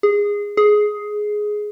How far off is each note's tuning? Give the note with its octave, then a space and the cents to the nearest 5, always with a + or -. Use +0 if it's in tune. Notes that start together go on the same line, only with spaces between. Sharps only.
G#4 -15
G#4 +10